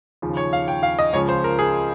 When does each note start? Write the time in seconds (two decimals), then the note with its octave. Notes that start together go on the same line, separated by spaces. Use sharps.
0.22 D#2 C#3 F3
0.37 C#5
0.53 F5
0.68 G5
0.83 F5
0.99 D#5
1.13 C#2 C#3 F3 C#5
1.29 C5
1.44 A#4
1.59 G#4